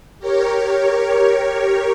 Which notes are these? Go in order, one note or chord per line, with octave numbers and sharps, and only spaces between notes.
G4 A#4 C#5